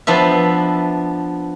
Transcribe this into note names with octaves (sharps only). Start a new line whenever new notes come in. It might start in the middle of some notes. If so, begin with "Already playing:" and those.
F3 B3 D4 E5